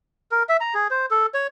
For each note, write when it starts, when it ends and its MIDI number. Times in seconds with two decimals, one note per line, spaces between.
0.31 0.43 70
0.49 0.57 76
0.61 0.74 82
0.74 0.87 68
0.90 1.06 72
1.11 1.26 69
1.34 1.47 73